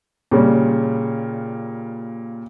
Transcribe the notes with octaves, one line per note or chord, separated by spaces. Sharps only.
A#2 C#3 G3